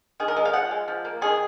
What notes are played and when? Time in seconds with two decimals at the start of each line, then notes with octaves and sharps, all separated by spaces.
0.20 D#3 G#4
0.28 A#4
0.36 G#3 D#5
0.45 F5
0.53 F3 F#5
0.71 G#3
0.88 F3
1.05 A#3
1.21 D#3 G#4